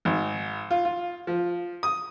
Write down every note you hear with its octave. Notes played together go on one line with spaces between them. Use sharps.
G#1
F4
F4
F3
D#6